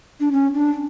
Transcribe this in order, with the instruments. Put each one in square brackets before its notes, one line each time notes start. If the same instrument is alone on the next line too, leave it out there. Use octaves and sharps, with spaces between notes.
[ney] D4
C#4
D4